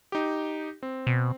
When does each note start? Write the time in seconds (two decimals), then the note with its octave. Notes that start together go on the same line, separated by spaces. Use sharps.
0.12 D#4 G4
0.83 C4
1.07 B2